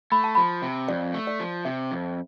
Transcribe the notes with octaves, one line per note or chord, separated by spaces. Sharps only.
A3 B5
A5
F3 B5
C3
F2 D5
A3
D5
F3
C3 E5
F2